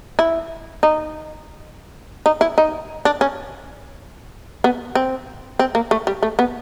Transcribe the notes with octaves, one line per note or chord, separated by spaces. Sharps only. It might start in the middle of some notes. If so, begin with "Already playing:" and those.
E4
D#4
D#4
E4
D#4
D4
C#4
B3
C4
C4
A#3
A3
G3
A3
B3